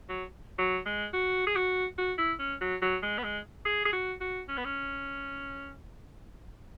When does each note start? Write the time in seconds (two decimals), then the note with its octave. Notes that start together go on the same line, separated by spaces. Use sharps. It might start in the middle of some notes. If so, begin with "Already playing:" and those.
0.09 F#3
0.58 F#3
0.86 G#3
1.13 F#4
1.47 G#4
1.56 F#4
1.98 F#4
2.18 E4
2.39 C#4
2.61 F#3
2.82 F#3
3.02 G#3
3.18 B3
3.24 G#3
3.65 G#4
3.85 G#4
3.93 F#4
4.21 F#4
4.49 C#4
4.57 B3
4.65 C#4